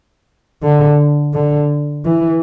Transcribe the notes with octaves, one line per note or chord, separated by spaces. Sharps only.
D3
D3
E3